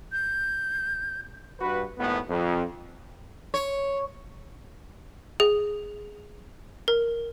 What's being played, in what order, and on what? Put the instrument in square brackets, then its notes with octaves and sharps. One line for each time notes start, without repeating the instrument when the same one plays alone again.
[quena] G6
[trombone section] G2 F#4 B4
G#1 A2 B3
F2
[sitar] C#5
[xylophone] G#4
A#4